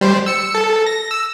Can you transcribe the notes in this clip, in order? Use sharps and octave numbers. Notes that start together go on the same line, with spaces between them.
G3 C5
E6 C#7
A4
A#6
E6